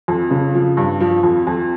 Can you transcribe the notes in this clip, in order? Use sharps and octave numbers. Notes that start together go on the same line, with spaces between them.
F2
C#3
F3
G2
F3
F2
F2